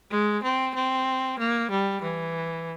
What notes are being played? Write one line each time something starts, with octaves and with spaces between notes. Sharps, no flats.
G#3
C4
C4
A#3
G3
E3